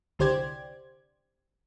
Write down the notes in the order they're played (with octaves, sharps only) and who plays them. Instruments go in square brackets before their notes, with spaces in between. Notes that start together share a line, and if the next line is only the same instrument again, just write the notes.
[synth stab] C2 D3 G4 C5 D5 G#6